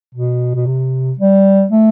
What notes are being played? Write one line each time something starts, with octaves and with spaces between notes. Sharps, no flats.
B2
B2
C3
G3
A3